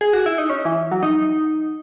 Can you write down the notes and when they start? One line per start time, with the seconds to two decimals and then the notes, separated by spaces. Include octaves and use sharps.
0.01 G#4
0.13 F#4
0.26 E4
0.38 D#4
0.50 C#4
0.65 E3
0.91 F#3
1.03 D#4